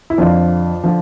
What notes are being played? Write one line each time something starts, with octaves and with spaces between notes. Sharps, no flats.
E4
F2 D3 F3 D4 F4
D3 F3